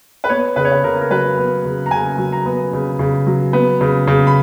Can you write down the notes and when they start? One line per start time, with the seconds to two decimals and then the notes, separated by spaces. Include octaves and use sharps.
0.24 B4
0.29 B3 C#5
0.56 C#3 B4
0.65 C#5
0.72 B4
0.84 C#3 A#4
1.01 A#4
1.10 F#3 B4
1.37 B3
1.65 C#3
1.86 A#5
1.91 C#3 G#5
2.18 F#3
2.32 A#5
2.46 B3
2.73 C#3
2.99 C#3
3.27 F#3
3.53 B3
3.81 C#3
4.07 C#3
4.27 B5